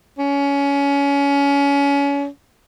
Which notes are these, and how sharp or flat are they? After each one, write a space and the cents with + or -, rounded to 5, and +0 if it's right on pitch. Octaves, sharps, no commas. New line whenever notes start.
C#4 +25